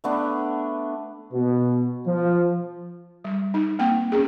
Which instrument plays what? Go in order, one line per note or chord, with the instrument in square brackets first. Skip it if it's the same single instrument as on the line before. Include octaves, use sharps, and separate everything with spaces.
[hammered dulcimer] A3 B3 D4
[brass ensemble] B2
F3
[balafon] G3
D#4
A#3 C4 G5
C#4 G#4